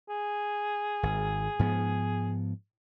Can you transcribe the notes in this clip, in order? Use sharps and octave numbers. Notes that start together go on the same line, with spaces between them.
G#4
G#1
G#2 F3 B3